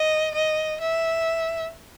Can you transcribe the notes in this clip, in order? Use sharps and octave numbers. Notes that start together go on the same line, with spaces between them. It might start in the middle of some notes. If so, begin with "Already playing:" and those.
Already playing: D#5
D#5
E5